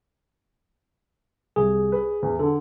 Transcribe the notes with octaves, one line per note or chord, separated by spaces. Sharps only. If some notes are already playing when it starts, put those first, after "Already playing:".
C2 G#4
B4
E2
D3 A4